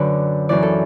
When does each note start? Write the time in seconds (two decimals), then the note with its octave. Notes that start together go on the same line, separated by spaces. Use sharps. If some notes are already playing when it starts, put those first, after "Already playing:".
Already playing: F#2 D3 B4 D5
0.49 F#2 E3 D5
0.63 A4